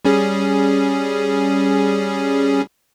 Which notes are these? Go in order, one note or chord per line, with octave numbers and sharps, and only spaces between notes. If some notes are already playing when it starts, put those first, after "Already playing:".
G3 C#4 G#4